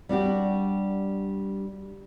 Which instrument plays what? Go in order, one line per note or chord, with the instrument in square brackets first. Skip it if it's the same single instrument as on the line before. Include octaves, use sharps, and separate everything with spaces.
[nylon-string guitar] G3 D4 F#4 G4